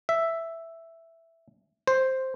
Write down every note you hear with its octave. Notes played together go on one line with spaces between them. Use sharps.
E5
C5